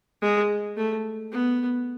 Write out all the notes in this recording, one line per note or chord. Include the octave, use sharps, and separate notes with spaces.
G#3
A3
B3